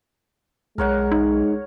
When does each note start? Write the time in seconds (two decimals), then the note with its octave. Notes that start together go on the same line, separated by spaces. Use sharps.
0.78 B1 G#3 A#4 C#5 F#5
1.12 D#4